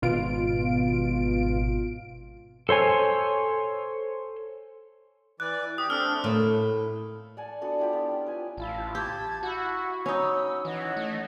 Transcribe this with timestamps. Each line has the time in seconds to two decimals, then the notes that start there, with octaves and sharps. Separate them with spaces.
0.02 G#1 B2 F4 D7
2.69 A4 C5 C#5 G#5
5.40 E3 D5 F#6
5.78 G4 D#6
5.90 A3 C4 D4 E6 F6
6.24 A2 A3 A#3 E5
7.37 D5 F#5 G#5 A5
7.61 B3 D4 F#4 A4
7.79 E4 F4 G4 G5
7.93 B3
8.11 C#4
8.26 B4 G#5
8.57 A1 E4 F4 A5
8.95 G4 A5 G#6
9.43 E4 F#4 F#5
10.06 C#4 D#4 B5 E6
10.65 E3 C#5 D#5 F#5
10.97 A3